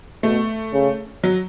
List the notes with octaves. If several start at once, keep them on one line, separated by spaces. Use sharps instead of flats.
B2 A3
C#3
F#3